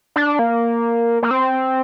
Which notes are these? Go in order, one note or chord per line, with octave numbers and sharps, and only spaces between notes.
D4
A#3
A#3
C4